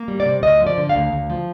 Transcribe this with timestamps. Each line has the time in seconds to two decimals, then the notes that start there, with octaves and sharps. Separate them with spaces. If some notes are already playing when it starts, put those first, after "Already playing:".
Already playing: A#3
0.08 G3
0.20 D5
0.26 C3
0.43 D2 D#5
0.61 F3
0.67 D5
0.78 D3
0.89 F5
0.95 D2
1.12 D2
1.30 F3